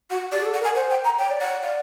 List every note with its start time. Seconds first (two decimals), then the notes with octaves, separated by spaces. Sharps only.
0.10 F#4 F#5
0.32 G4 D5
0.40 G#4
0.46 A4
0.54 F#5
0.61 A#4
0.64 G#5
0.75 C5 F#5
0.90 G5
1.05 A#5
1.19 C#5 G5
1.30 D5
1.41 C#5 F#5
1.63 D5 F5